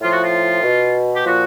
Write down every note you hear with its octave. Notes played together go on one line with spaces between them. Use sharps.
A2 F3 F4
F#4
F4
B2
G4
A#2 F3 F#4